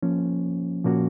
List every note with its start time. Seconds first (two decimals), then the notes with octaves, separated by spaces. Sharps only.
0.02 F3 A#3 C#4
0.84 A#2 F3 A#3 C#4 F#4